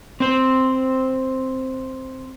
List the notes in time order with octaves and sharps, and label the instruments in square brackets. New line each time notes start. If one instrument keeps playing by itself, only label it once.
[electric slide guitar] C4 C5